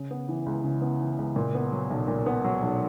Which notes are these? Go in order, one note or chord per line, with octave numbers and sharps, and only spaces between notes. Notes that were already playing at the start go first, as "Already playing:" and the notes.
Already playing: C#3
B3
E3
C#2
C#3
B3
E3
C#2
A#2
B3
F#3
B1
A#2
B3
F#3
B1